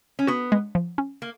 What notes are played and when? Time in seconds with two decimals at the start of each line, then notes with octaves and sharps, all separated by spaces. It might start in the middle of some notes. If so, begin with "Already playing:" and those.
0.19 C#4
0.27 B3 F#4
0.52 G#3
0.75 F3
0.98 C#4
1.22 A#3